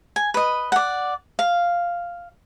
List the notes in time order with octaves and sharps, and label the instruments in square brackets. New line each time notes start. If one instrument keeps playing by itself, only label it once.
[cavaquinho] G#5
B4 D#5
D5 F#5
F5